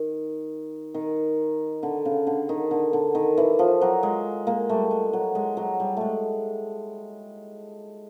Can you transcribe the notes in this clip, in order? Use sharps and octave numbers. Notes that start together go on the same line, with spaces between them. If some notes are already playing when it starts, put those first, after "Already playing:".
Already playing: D#3
D#3
D3
C#3
D3
D#3
D3
D3
D#3
E3
F3
F#3
G#3
G#3 A#3
G3 A3
G#3
F#3
G#3
F#3
G3
G#3 A3